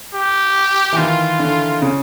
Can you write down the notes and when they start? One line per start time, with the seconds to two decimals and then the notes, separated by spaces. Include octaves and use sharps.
0.15 G4
0.93 E3
0.98 D#3 F4
1.39 D3
1.82 C#3